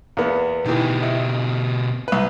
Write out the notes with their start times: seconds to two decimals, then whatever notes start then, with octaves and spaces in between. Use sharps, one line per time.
0.17 E2 A#3 B3
0.65 B2 D#3 E3 G4
1.02 D#4 E4
2.08 C2 B4